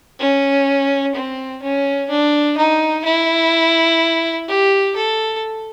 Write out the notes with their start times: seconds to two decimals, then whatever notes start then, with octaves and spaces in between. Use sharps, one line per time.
0.20 C#4
1.15 C4
1.62 C#4
2.10 D4
2.58 D#4
3.05 E4
4.48 G4
4.96 A4